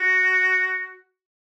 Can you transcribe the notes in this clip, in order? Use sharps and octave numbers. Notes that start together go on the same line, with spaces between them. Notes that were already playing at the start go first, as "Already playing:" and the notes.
Already playing: F#4